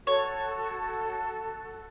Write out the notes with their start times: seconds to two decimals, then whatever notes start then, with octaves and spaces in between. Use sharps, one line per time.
0.07 F#4 A4 C#5